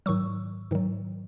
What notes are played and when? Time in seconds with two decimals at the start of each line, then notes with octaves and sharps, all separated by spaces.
0.06 G#2 D#3 F#3 C#6 E6
0.71 G#2 D#3 F#3